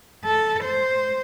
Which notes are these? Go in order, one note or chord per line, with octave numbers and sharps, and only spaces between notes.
A4
C5